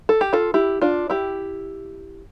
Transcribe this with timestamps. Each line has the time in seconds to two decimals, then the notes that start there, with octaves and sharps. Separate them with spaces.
0.09 A4
0.21 G4
0.33 F4 A4
0.54 E4 G4
0.82 D4 F4
1.10 E4 G4